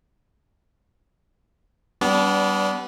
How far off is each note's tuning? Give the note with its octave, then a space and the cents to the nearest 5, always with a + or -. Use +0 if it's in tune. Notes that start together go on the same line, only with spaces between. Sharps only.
G3 -20 B3 +5 D4 -30